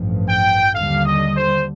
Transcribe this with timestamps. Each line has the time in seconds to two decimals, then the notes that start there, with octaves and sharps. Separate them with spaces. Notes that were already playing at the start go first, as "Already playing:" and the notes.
Already playing: A1 G2 F3
0.28 G5
0.74 D#2 D3 G3 F5
1.05 D#5
1.36 C5